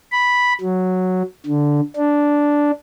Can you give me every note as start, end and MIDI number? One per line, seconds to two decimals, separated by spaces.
0.12 0.53 83
0.61 1.22 54
1.46 1.81 50
1.97 2.71 62